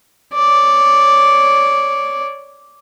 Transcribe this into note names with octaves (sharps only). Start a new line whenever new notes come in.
C#5 D5